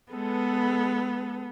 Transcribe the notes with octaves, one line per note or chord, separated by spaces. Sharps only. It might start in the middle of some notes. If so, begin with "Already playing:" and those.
G#3 B3 A4 B4